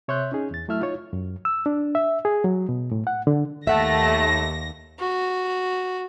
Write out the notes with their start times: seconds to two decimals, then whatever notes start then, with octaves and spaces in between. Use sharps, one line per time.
0.08 C3 C#5 E5 C6 F#6 G6
0.32 C#4 D#4 G#4
0.51 E2 A6
0.68 F#3 A3 E4 E5 F6
0.81 D#4 F4 C#5
1.13 F#2
1.45 E6
1.66 D4
1.95 E5
2.25 G#4
2.44 F#3
2.69 B2
2.92 A2
3.07 F#5
3.27 D3
3.67 D#2 A3 E5 F#5 A5 A#6
4.99 F#4